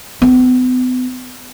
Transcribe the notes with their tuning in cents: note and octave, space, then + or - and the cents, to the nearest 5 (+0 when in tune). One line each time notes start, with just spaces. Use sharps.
B3 +40